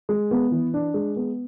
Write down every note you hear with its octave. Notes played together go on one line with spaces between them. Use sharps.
G#3
B3
E3
D4
G#3
B3